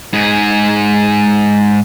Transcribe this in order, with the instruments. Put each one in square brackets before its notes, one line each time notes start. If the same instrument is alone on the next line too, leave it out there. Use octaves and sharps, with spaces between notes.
[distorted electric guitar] G#2 G#4